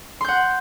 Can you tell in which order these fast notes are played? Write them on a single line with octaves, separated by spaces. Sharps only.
C6 G6 F#5